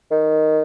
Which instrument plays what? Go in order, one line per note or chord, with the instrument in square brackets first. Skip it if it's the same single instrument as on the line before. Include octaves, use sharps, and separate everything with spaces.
[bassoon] D#3